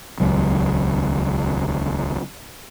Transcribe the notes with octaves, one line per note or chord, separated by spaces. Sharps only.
D#1 C#2 F#3